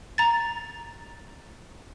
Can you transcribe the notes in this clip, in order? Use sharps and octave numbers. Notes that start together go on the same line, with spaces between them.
A#5 A6